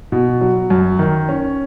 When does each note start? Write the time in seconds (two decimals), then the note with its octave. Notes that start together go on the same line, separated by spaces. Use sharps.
0.12 B2
0.41 F#3
0.70 F#2
0.99 D#3
1.29 C#4